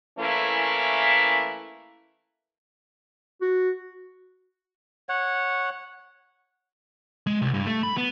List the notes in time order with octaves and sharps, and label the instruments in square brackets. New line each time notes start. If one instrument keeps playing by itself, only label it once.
[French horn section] E3 A3 A#3 C#4 E4
[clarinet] F#4
[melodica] C#5 F#5
[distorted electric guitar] G#3
C2
G2
A3
B5
B3